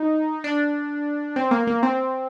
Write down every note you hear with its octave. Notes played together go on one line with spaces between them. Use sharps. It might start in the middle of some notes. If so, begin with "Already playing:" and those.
Already playing: D#4
D4
C4
A#3
A#3
C4